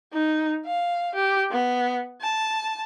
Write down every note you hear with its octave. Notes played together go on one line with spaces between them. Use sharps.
D#4
F5
G4
B3
A5